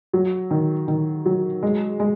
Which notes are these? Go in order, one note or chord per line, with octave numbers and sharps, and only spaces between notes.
F#3
D#3
D#3
F#3
G#3
G#3